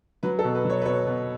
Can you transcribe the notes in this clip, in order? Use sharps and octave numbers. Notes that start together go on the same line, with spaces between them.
F#3 B4
A4
B2
B4
F#3 C#5
B4
B2 C#5
B2